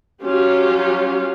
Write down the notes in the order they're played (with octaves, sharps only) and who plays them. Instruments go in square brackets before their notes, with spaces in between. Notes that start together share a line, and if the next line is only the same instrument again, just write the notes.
[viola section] F#3 C#4 F4 G4